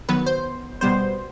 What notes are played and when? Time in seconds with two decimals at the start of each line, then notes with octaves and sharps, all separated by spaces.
0.09 D#3 F#3 B3 B4
0.26 C5
0.81 B2 G3 B3 C5